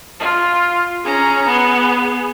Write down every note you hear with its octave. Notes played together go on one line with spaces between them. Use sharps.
F4
C#4 G#4 A#5
B3